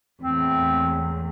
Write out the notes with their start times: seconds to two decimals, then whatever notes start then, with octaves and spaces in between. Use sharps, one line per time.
0.22 E2 A2 C4